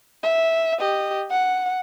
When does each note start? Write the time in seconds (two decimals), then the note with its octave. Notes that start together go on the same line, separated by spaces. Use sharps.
0.23 E5
0.80 G4 D#5
1.31 F#5